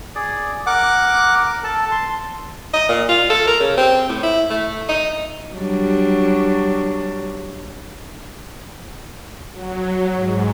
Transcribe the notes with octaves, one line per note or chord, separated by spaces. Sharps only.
G#4 D5
A#4 F#5 D6
A4 A5
C6
D#5
A#2
F4
A4
A#4
C#3
C4
A2
E4
A3
D#4
F#3 G3 D4
F#3
G#2